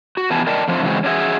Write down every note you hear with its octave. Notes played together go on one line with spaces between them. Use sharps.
F#4
E3 B3 G4 G#5 A5
A#4 D5 D#5 G5 A5
D3 F3 A3 C4
C#3 E3 F#3 G#3 C4
C#4 D4 F#4 G#4 E5